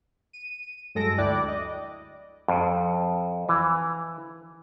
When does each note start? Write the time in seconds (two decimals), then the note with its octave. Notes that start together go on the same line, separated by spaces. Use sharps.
0.33 D#7
0.95 G2 F#3 G#3 A4 A#6 D7
1.18 D2 E4 D5 G5 D6 F#6
1.48 D#5
2.48 F2
3.49 E3